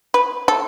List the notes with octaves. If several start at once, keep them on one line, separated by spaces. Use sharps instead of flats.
B4
A4